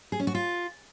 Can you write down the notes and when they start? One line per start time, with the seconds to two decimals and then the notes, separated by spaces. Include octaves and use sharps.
0.12 G#4
0.20 C#4
0.27 F#4
0.35 F4